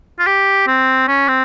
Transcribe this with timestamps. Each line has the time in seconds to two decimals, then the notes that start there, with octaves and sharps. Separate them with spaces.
0.19 F4
0.27 G4
0.67 C4
1.08 C#4
1.28 C4